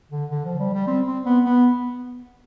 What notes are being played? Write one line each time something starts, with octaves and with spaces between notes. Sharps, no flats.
D3
D3
F3
G3
G3
C4
C4
B3
B3